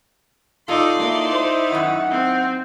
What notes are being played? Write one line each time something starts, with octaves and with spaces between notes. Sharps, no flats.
D#4 F4 A4 D5 C6
A#3 D#4 E4
C5
F#2 D#3 F#5
C4